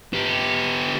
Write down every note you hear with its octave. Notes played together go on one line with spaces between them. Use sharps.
B3 G4